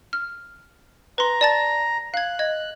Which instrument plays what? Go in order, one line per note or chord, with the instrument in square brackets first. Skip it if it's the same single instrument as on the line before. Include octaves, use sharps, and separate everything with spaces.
[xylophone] F6
[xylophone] B4 C6 [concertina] A#5
[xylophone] D5 A5 A6
[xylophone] F5 G#6 [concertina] F#6
[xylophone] D#5 G#6